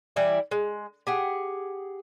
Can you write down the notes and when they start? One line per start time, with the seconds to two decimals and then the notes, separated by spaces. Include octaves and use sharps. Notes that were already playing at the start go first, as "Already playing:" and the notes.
0.16 E3 G3 E4 D5
0.51 G#3
1.07 G4 G#4 F#5